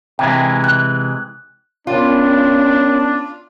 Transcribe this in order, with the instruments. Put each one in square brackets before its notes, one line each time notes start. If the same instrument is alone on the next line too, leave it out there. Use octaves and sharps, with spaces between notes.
[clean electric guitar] C3 E3 G#3 [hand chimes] G5
[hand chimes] F#6
[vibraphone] B3 A#4 G5 [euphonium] C#4 [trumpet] D4 [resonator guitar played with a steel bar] F4